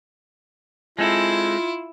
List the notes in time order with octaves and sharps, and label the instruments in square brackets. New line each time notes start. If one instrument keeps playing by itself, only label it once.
[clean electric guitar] G#3 C4 A4 [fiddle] E4 [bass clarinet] F4